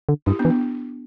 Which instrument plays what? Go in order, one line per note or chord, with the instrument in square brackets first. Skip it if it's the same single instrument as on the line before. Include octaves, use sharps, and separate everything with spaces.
[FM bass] D3
[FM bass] G2 [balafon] E4 G4
[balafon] B3 D4
[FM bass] E3
[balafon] B3